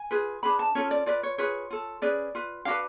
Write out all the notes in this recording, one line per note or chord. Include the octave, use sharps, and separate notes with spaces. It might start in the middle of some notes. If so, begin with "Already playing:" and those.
Already playing: G#5
F4 G#4 B4
D4 G#4 B4 B5
A5
C#4 F4 A4 C#5
D5
F4 B4 D5
C#5
F4 G#4 B4 C#5
F4 A4
C#4 G#4 B4 D5
F4 B4
D4 F#4 B4 F5